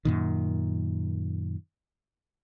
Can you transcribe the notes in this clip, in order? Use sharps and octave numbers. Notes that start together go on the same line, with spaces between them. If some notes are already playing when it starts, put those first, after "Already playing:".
F#2 A#2 D#3